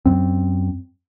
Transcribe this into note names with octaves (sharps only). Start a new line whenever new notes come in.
F#2 C4